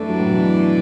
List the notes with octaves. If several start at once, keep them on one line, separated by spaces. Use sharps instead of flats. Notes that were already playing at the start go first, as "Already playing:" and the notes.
Already playing: F#2 E3 A3 D4 B4 D5
F#3
A2
B2